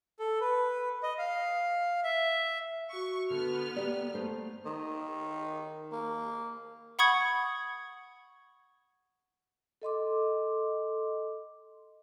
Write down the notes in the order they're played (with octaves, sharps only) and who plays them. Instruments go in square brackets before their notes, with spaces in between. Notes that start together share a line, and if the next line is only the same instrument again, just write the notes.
[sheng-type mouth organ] A4
B4
D#5
F5
E5
[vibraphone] F#4 [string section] C#6
[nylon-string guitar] D3 [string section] B3 F6
[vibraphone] A#3 [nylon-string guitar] G4 [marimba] D5
[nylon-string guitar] A3 C5
[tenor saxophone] D#3
A#3
[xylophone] F#5 B5 C#6 D#6 G#6 C#7
[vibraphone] A4 D#5 C6 D6